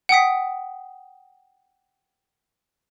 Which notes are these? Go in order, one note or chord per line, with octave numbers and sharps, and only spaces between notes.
F#5 G5 D#6 B6